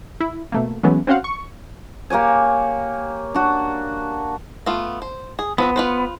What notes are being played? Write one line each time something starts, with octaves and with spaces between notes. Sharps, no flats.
E4
B2 A3 A#3
E3 F#3 G#3 A3 B3 C#4
C4 C#4 F#4 C5 F5 F#5
C#6
A#3 G4 C#5 G#5
D4 F#4
A3 B3 F4
C5
G#4
F3 B3 C4 B4
F4 B4 C5